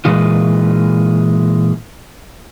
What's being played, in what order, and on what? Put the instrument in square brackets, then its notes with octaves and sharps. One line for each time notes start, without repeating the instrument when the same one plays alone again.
[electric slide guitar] A#2 E3 G#3 F4